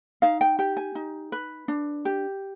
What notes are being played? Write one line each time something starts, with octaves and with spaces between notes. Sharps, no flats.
D#4 F5
G5
G4 G5
G#5
D#4
B4
D4
G4